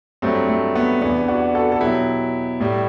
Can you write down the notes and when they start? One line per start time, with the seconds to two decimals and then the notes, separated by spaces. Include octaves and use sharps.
0.22 G2 F#3 A3 C4
0.49 A3
0.75 B3
1.01 E2 C3 E3 B3 D4
1.28 D4 F#4
1.55 F#4 A4
1.72 A4
1.81 B2 F#3 E4 G4
2.60 A2 G3